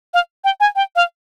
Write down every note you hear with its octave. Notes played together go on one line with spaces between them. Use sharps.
F5
G5
G#5
G5
F5